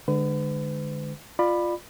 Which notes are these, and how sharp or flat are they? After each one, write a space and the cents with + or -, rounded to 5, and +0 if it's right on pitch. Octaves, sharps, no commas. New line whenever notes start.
D3 +20 G#3 +5 B4 +40
F4 +0 D5 +30 B5 +0